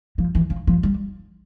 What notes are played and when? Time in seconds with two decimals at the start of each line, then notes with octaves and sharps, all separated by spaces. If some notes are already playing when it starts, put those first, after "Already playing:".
0.18 F3
0.35 E3
0.50 C#3
0.67 F3
0.83 G3